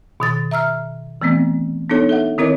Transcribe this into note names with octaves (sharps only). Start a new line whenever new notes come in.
B2 D#3 A6
E5 A#5 E6 F6
E3 A3 B3 C4
B3 D4 D#4 A4 C#5
A4 E5 F#5
D#3 C4 E4 A#4 C#5 D#5